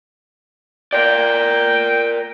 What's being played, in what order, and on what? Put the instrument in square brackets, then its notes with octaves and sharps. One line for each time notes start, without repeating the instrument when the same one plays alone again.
[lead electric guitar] A#4 D5 [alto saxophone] G5